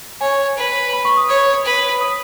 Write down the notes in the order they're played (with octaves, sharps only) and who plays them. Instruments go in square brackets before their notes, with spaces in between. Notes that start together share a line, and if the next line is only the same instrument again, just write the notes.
[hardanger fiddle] C#5 [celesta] G#5
[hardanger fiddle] B4
[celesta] B5
C#6
D#6
[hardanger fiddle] C#5
B4
[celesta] D#6